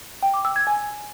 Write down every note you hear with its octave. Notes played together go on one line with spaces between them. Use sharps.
G5
D6
E6
G#6
G#5